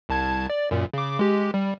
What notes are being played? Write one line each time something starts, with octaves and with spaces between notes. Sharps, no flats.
C2 A5 G#6
D5
F#2 A#2
C#3 D6
G#3 G4
G3